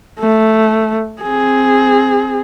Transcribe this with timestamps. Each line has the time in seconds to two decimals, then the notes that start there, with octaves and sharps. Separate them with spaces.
0.20 A3
1.22 C4 G#4